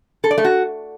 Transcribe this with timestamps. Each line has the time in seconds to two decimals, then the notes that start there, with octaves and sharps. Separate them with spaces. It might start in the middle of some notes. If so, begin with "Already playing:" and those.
0.24 A4
0.31 D5
0.38 A3
0.45 F#4